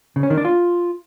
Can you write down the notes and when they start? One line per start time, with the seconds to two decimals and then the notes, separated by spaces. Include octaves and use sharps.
0.16 C#3
0.23 C#4
0.30 D#3
0.37 D4
0.45 F4